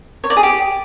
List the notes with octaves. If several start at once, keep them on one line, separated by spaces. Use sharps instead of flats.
C#5
D5
G#4
G4